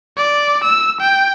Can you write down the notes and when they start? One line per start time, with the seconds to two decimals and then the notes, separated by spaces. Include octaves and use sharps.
0.17 D5
0.64 E6
1.02 G5